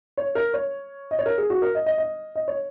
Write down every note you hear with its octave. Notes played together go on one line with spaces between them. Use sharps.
C#5
A#4
C#5
D#5
C#5
A#4
G#4
F#4
A#4
D#5
D#5
D#5
D#5
C#5